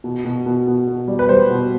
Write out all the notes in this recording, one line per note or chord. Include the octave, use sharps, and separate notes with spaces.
B2
B2
B2
B2
B2
G3
B4
G3 C5
B2